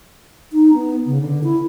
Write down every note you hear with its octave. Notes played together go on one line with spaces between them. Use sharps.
D#4
B3
C#3
D3
E4